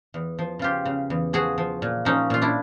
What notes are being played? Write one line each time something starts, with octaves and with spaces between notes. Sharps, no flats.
E2
F3
C#3 F4 G4
C#3
E2
F3 F#4 G#4
F3
A#2
F3 C#4 D#4
A#2 F4
D4 E4